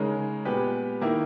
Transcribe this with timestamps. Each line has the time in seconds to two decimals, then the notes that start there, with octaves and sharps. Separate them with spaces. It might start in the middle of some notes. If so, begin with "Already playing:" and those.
Already playing: C#3 G#3 D#4 A#4 C#5
0.45 A#2 G#3 B3 G4 B4
1.01 D#3 A#3 E4 A#4